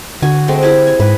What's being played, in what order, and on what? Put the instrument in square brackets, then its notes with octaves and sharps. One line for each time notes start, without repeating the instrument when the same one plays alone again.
[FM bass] D3 [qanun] F#4 G#5
[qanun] G#3 A3 C4
E4 G4 G#4
G#5
[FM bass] G#2 [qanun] B4